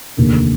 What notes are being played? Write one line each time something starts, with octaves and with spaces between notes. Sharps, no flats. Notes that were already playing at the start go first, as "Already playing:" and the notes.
F1 D#2 D3